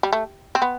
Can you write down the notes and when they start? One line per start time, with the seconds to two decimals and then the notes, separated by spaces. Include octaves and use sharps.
0.03 G3
0.13 A3
0.55 C4
0.62 B3